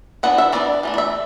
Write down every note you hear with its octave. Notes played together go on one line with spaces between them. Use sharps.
E3 B3 D4 F#5
E5
E3 B3 D4 D5
E3 A3 D4
D5
E5